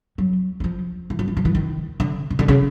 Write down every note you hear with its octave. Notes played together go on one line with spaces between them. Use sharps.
F#3
F#3
F3
E3
F3
E3
F3
E3
D#3
D3
C#3
D3
C#3